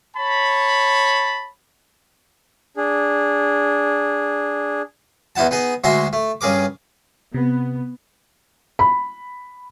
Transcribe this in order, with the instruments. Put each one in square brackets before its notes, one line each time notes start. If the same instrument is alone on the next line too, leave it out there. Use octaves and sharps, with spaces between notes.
[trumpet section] C#5 A5 B5
[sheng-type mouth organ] D4 G#4
[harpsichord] E2 D#4 E4 F#5 A5
B3 D#4 G#4
D2 G#3 F#4 E5 A#5 C6
A3
G2 C#3 G#4 A#4 D6
[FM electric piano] C3 [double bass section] B3
[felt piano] B5